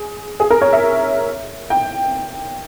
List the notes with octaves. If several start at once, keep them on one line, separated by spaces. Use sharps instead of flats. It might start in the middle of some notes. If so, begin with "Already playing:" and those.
Already playing: G#4
G#4
A#4
C#5
E5
G5